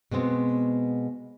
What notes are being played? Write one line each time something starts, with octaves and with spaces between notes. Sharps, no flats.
B2 G#3 B3 C4